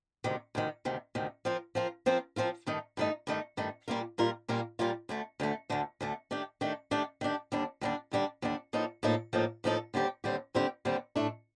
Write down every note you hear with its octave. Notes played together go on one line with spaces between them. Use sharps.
D2 C3 D#3
D2 C3 D#3
D2 C3 D#3
D2 C3 D#3
F3 C4 F4 A#4
F3 C4 F4 A#4
F3 C4 F4 A#4
F3 C4 F4 A#4
G2 D#3 A3 D#4
G2 D#3 A3 D#4
G2 D#3 A3 D#4
G2 D#3 A3 D#4
A#2 G3 A#3 F4 A#4
A#2 G3 A#3 F4 A#4
A#2 G3 A#3 F4 A#4
A#2 G3 A#3 F4 A#4
D2 D3 A3
D2 D3 A3
D2 D3 A3
D2 D3 A3
D#3 A3 D4 G4
D#3 A3 D4 G4
D#3 A3 D4 G4
D#3 A3 D4 G4
D#2 D3 G3 D4
D#2 D3 G3 D4
D#2 D3 G3 D4
D#2 D3 G3 D4
A2 F3 A#3 D#4 A4
A2 F3 A#3 D#4 A4
A2 F3 A#3 D#4 A4
A2 F3 A#3 D#4 A4
D#2 D3 G3 C4 G4
D#2 D3 G3 C4 G4
D#2 D3 G3 C4 G4
D#2 D3 G3 C4 G4
A2 A3 D4